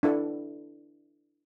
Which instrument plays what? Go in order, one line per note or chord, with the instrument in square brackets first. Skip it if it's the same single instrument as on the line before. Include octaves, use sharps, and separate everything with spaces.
[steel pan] D4 E4 A4